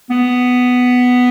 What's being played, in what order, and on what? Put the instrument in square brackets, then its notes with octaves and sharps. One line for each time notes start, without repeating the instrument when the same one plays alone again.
[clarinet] B3